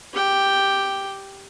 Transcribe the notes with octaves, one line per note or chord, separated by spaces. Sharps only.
G4 G5